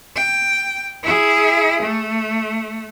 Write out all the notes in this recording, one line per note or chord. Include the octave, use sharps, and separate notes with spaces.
G5
E4 G#4
A3